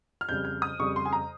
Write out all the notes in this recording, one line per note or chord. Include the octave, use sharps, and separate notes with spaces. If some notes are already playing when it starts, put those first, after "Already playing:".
F6
F2 C#3 G3 G6
G6
D#6
F2 C#3 G3 C#6
C6
G#5
A#5